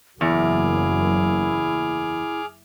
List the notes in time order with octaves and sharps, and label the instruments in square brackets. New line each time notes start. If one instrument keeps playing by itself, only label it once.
[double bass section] F#1 F#3 A#3 [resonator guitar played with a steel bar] E2 [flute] E4 [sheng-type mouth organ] G#4 D6 F6